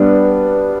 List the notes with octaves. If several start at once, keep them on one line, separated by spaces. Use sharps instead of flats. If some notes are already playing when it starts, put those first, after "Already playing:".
Already playing: G3 B3 D4